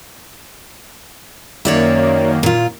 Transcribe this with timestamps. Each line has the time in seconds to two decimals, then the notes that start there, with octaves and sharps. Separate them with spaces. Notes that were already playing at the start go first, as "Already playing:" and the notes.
1.65 F#2 D#3 A#3 C#5 D5 E5
2.43 A#2 F4